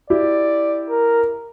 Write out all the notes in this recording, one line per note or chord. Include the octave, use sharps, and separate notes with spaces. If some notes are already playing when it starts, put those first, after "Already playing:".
E4 G4 D5
A#4